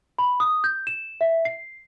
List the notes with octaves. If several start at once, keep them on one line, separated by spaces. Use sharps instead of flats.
B5
D#6
G6
E7
E5
C7